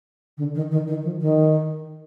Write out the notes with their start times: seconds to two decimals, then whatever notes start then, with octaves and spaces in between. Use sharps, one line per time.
0.38 D3
0.55 D#3
0.71 D#3
0.87 D#3
1.04 F3
1.21 D#3